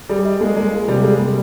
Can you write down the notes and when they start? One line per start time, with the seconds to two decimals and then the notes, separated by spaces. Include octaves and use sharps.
0.09 G3 G#4
0.25 D#5
0.40 G#3 A#3
0.56 G#3 A#3
0.72 F4
0.88 C3 G3
1.03 G#3 G#4
1.19 G3 A#3